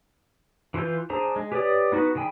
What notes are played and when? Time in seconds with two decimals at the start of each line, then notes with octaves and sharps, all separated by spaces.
0.74 E3 F4 B4 C6 G6
1.10 D4 G#4 C5 A#5
1.36 G#3
1.52 G4 B4 C#5 D5 D#6
1.92 B3 D#4 F#4 B4
2.15 D3 D#3 G#4 G5 B5